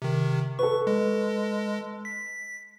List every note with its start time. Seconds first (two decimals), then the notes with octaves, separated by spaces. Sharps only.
0.02 C3 D#3
0.59 A4 B4 C#6
0.87 G#3
2.05 B6